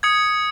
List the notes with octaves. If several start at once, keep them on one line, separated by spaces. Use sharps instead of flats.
D#6 G#6 C#7